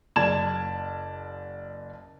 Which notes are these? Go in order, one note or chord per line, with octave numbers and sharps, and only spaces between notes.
F#1 D5 A5 G#6 E7